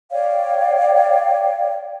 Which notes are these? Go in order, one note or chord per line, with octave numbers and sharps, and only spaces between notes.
C#5 D5 F5 G5